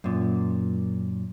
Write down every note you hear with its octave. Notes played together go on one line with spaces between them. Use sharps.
F#2 A#2